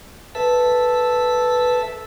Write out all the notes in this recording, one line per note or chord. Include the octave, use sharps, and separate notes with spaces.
A4 B4 E5 A5